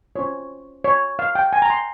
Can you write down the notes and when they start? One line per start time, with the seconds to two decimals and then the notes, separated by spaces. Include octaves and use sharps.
0.16 C#4 F4 C5 C#5
0.84 C#5
1.19 F5
1.35 G5
1.53 G#5
1.62 A#5
1.70 C6